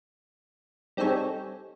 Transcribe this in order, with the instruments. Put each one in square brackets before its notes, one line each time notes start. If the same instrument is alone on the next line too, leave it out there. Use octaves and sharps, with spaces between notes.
[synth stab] G3 C4 D#4 G#4 A4 C#5